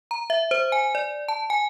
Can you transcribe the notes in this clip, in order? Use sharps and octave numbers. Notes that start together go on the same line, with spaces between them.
A#5
E5
C5
G#5
D5
A5
G#5